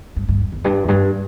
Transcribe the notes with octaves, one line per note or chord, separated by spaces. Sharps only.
G2
G2
E2
E2
G2
E2
G2